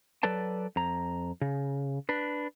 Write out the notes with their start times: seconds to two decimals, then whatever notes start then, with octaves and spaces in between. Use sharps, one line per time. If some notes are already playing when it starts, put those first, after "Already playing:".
0.23 F#3 A4 B4 D5 A5
0.76 F2 A#5
1.41 C#3
2.09 D4 B4